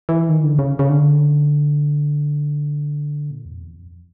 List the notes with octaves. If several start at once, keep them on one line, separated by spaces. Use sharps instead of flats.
E3
D#3
D3
C#3
C#3
D3
A#2
E2
F2
E2
F2